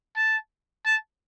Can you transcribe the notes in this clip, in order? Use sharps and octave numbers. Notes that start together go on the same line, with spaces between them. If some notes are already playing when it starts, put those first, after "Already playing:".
A5
A5